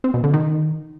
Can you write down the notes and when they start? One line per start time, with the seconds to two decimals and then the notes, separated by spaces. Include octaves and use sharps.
0.04 C4
0.14 B2
0.24 D3
0.33 D#3